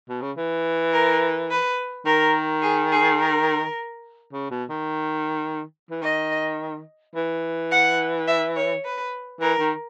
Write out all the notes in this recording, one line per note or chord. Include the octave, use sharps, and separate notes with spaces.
B2
C#3
E3
A#4
B4
D#3 A#4
G#4
G#4
A#4
C#3
B2
D#3
E3
D#3 D#5
E3
F#5
E5
C#5
B4
E3 A#4
D#3